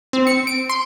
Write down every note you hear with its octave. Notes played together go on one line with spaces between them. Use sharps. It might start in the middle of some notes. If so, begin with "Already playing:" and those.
C4
C#7
D7
C6